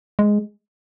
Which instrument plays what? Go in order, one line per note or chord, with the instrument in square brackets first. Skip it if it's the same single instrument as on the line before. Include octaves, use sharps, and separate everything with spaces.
[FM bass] G#3